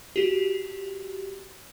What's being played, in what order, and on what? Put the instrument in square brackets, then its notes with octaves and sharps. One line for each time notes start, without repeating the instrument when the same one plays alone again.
[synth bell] F#4 G4